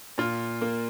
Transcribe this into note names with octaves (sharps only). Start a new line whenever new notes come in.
A#2 F4
A#3